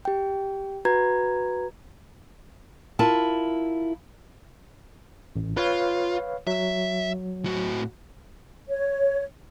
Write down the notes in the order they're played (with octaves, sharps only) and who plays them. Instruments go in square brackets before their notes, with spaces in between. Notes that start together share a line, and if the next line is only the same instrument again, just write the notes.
[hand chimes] G4 G5
F#4 B4 A#5 G#6
[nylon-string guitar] E4 F4 A#4 A5
[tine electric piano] A1
[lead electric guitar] F4 [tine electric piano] B4 C#5 F5
[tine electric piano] F#3 [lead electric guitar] E5
[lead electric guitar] A2 F#4
[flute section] C#5